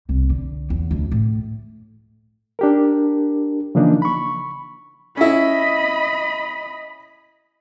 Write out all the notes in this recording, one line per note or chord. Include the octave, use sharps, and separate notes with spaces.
C2
D3
E2
D2
A2
D4 G4 A#4
C#3 E3 F3 A#3 D4 D#4
B5 C#6
C#4 E4 D#5 B5